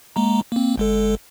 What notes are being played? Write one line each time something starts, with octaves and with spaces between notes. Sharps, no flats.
G#3 A#3 A#5
A#3 C4
G1 G#3 A4